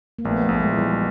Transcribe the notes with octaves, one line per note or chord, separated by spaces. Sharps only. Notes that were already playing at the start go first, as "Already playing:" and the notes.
A#3
A#1 A3 B3
A3
A#1
G#3
E3
G3